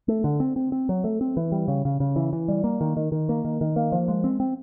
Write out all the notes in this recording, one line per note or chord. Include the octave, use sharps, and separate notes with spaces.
A3
D3
C4
C4
C4
F#3
A3
C4
E3
G3
C#3
C#3
C#3
E3
E3
G3
A#3
D#3
D#3
D#3
A#3
D#3
D#3
A#3
F3
G#3
C4
C4